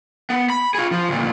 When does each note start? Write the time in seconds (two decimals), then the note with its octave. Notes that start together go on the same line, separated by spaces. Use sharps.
0.30 B3
0.50 B5
0.75 F4 G#4
0.92 F3
1.09 D2 A#2